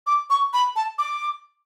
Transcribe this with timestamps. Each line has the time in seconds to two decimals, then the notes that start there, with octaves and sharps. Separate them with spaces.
0.07 D6
0.30 C#6
0.53 B5
0.76 A5
0.98 D6